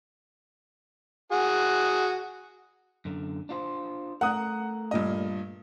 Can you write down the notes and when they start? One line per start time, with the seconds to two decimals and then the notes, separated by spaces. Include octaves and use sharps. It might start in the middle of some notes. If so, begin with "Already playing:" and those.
1.32 F#4 G#4
3.05 F#2 D3
3.49 D4 F4 C5
4.21 A3 A#4 F#5 D#6 F#6
4.91 G2 A#2 D#5